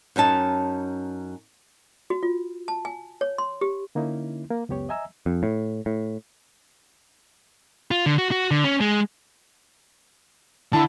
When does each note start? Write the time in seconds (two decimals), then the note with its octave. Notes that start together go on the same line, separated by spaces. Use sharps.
0.16 F#2 C#4 D#4 A5
2.10 F#4
2.23 F4
2.68 A5
2.85 G#5
3.21 C#5
3.38 C6
3.61 G4
3.95 D3 A#3 C#4 D#4 E4
4.51 A#3
4.69 C#2 F#2 B3 G4 C#5
4.89 D#5 E5 G#5 A#5 E6
5.26 F2
5.43 A2
5.86 A2
7.91 F4
8.06 D3
8.18 F#4
8.31 F#4
8.51 D3
8.64 C#4
8.81 G#3
10.73 D3 E4 A5